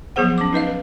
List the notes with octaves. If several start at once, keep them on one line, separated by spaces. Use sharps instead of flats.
F3 F#3 B3 G#4 C5 F#5
C#4 D6
D#4 B4 D#5 F5
B4